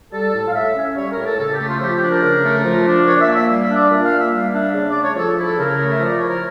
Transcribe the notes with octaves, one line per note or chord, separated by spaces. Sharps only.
G3 A4
A2
F5
A2 E5
C#4
G3 C#5
A#4
A2
A4
C#3 A4
G4
A3
F4
F3 G4
G4
D4
A#4
C#3
A3
F3
D4
A#2 C#5
D5
E5
A#3
E5
G3 F5
E5
D4
D5
A#2 E5
F5
A#3
E5
G3 F5
D4 E5
C#3 D5
D5
A3
C#5
F3 A4
E4
A4
C#3 A#4
A3
E5
F3 D5
E4 C#5
A#4